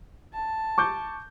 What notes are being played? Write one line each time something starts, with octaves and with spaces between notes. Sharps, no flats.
A5
C#6 D6 G6